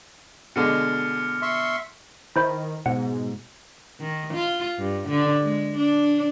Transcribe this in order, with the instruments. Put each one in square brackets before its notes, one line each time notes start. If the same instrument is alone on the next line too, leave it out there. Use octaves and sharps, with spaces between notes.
[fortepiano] B2 D3 G#3 [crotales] F6 C#7
[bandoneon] E5 C6 C#6
[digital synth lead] D#3 [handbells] E4 C5 B5
[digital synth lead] G#2 [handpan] B2 [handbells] F#5
[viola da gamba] D#3
F4
G2
D3
G#3
D4